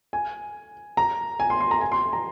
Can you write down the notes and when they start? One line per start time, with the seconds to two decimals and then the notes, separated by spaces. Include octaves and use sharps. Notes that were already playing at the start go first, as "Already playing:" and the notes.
0.13 G#5
0.97 A#5
1.40 G#5
1.50 C6
1.60 C6
1.71 A#5
1.81 G#5
1.92 C6
2.13 A#5